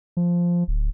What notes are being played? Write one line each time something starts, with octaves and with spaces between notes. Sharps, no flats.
F3
D1